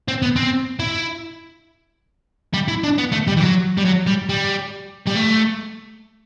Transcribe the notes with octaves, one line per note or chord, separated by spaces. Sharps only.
C4
B3
C4
E4
G3
E4
D4
B3
A3
G3
E3
F#3
G3
F#3
G3
G3
G3
A3